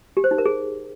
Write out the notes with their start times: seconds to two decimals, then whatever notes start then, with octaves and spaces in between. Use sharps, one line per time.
0.17 G4
0.24 C5
0.31 D#4
0.38 A#4
0.46 G#4